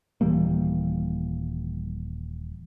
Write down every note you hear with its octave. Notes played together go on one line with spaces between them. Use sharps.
D#1 E3 G3 A#3